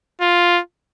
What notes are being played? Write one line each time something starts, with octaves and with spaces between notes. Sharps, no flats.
F4